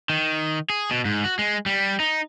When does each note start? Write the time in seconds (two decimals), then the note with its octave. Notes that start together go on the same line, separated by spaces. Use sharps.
0.10 D#3
0.70 G#4
0.91 B2
1.05 G#2
1.24 F#4
1.39 G#3
1.66 G3
2.00 D#4